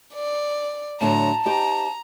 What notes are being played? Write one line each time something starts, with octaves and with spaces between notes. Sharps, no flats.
D5
A2 D3 F#3 A5 A#5
D#4 G4 C5 A#5